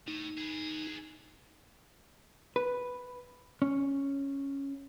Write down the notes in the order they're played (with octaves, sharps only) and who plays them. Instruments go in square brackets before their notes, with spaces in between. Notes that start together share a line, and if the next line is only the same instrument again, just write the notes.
[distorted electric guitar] A2 [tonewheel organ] D#4
[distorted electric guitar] G#4 B4
[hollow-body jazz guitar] B4
C#4